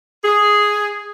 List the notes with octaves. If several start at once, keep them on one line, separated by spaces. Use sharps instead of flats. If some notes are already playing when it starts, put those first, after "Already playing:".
G#4